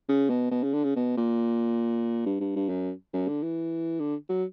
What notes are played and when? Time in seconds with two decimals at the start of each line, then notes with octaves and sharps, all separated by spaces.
0.09 C#3
0.30 B2
0.51 B2
0.63 C#3
0.73 D3
0.84 C#3
0.96 B2
1.17 A#2
2.26 G2
2.40 G2
2.56 G2
2.69 F#2
3.14 F#2
3.28 D3
3.42 E3
4.00 D3
4.29 F#3